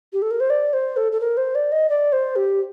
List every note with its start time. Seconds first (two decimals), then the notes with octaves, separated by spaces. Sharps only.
0.13 G4
0.22 A4
0.31 A#4
0.40 C5
0.50 D5
0.73 C5
0.97 A4
1.12 A4
1.20 A#4
1.37 C5
1.55 D5
1.72 D#5
1.89 D5
2.12 C5
2.36 G4